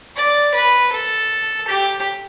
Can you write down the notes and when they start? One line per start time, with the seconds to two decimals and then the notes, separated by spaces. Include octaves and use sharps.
0.16 D5
0.54 B4
0.92 A4
1.68 G4